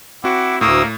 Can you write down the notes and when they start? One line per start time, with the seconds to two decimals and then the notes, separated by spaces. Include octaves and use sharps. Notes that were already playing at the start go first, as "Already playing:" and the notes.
0.24 C4 E4 F#4 F#5 D6
0.61 D2 A2 A#3 C#6 D#6 E6